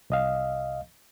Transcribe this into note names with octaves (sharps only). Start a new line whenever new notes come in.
C2 D#5 F5